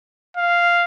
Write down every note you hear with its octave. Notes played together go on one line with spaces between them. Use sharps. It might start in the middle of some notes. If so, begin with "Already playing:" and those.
F5